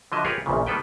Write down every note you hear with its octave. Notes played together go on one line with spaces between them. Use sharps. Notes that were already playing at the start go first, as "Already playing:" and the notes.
D3 F3 F#3 D#5 E5
F4 G4 G#4 A#4 B4 C#5
A#1 E2 A#2 C#3
D#3 G3 B3 A4 B4 G5